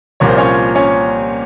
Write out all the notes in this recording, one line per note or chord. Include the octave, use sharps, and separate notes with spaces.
C2 A#2 F3 A#3 C#5
C5
C#4 C#5
C#4 C#5